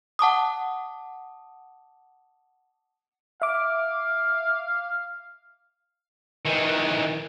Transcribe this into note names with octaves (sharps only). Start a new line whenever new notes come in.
F#5 A5 D6 D#6
E5 F5 D6
D#3 E3